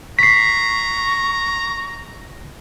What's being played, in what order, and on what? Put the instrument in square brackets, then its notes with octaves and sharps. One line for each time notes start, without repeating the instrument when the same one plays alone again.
[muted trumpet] A#5 [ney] C#6 [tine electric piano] B6 C7